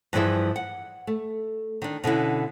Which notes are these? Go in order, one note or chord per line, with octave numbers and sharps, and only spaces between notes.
G2 E3 F3 E4 G#4 E5
F#5
A3
D#3 D4
B2 D3 C#4 E4